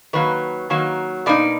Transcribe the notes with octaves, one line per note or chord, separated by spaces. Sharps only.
D#3 F#3 A#3 B4
D#3 F#3 A#3
B2 A#3 D#4 D5